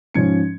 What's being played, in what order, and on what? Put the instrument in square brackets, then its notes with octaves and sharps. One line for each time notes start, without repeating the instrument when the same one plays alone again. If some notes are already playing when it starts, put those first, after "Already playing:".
[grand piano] G#2 F3 C#4 G#6 C#7